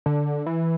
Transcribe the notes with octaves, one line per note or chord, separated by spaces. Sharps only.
D3
E3